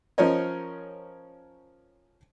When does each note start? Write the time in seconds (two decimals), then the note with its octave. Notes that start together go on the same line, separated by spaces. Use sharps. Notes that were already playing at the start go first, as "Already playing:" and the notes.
0.18 F3 C#4 A#4 C5 C#5 D#5